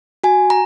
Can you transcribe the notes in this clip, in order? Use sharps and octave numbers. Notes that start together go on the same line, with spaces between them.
F#4 G#5
A#5